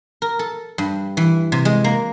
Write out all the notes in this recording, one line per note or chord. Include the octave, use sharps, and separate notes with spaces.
A#4
A4
G2
E3
C3
G#3
A#3